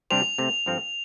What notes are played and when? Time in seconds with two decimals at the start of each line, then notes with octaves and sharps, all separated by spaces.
0.10 C3 G3 D4 G4 C5 F7
0.38 C3 A3 C4
0.66 G2 F3 C4 A4